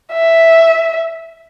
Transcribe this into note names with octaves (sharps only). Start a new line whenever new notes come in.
E5